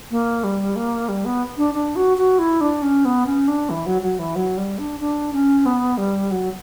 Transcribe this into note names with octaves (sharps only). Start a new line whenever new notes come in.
A#3
G3
A#3
G3
B3
D4
D4
F#4
F#4
E4
D4
C#4
B3
C#4
D4
E3
F#3
F#3
E3
F#3
G3
D4
D4
C#4
B3
G3
F#3